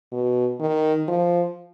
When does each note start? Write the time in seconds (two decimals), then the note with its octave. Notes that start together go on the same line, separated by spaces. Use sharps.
0.12 B2
0.60 D#3
1.08 F3